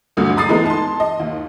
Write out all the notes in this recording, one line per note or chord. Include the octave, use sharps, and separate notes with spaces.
A1 D2 G2 D3 F#3
A#5 B5 D#6 A6 C7
E3 G#3 A3 B3 D#4
A5 C6
D#5
D#2